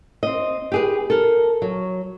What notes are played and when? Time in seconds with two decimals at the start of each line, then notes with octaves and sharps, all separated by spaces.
0.23 C4 D#5
0.72 G4 G#4 B4
1.10 A4 A#4
1.62 F#3